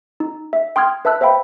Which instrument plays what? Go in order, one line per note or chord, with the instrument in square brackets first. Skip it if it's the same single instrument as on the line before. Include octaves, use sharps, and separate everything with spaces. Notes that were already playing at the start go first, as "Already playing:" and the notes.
[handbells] D#4
E5
G5 C6 D#6 F6 G#6
B4 E5 A5 E6 F#6
C5 E5 F5 G5 B5